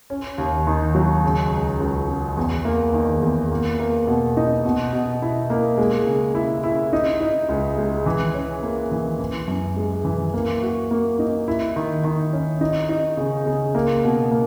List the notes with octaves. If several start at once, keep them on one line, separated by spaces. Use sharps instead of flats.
C#4
D#2
D#3
F#3
C#3
C#2
C#2
C#3
E2
A#3
D#3
E2
A#3
A#3
B2
D#4
B2
B2
E4
A#3
G#3
C#3
E4
E4
D#4
D#4
C#2
G#3
E3
C#4
A#3
E3
E3
F#2
G#3
E3
A#3
F#4
A#3
D#4
E4
D#3
D#3
C#4
D#4
D#4
C#3
C#3
A#3
B2
A#3